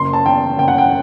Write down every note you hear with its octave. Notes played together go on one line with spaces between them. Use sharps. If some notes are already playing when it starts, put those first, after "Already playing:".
Already playing: F#1 C6
A5
E2 G5
F#1 G5
F#5
G5